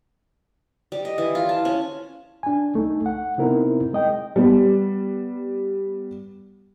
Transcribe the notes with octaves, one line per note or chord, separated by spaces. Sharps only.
G3
D#5
E3
F4
A5
C#4
D4 G#5
C2 A3 D#4
F#5
C3 B3 C4 D#4 E4 A#4
G#3 D#5 G5
G3 B3